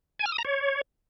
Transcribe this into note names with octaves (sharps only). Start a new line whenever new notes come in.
G#5
F6
D#6
A#5
C#5